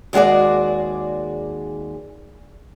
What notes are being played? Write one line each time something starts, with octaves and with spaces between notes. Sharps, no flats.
D#2 G#3 F#4 G#4 D5